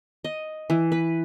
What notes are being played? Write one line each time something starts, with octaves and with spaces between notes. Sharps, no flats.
D#5
E3
B4